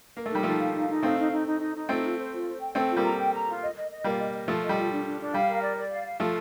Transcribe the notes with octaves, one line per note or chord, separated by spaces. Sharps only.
A#3 A#4
A3
G3 D#4
F3 A3 D#4
F5
D#4
D#4
A3 C4 F5
D#4
D#4
D#4
D#4
D#4
A3 C4 F4
F4
C5
F4
C5
G5
A3 C4 G5
F4
G3 A#3
A#5
G5
A#5
F4
D#5
D#5
D#5
G3 A#3 F4
D#5
D#5
F3 A3 F4
D#5
G3
F4
D4
D4
D4
G3 F5
A#4
D5
D5
F5
F5
F3 A3 F5